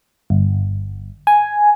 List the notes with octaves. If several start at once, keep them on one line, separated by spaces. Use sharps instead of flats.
G1
G#5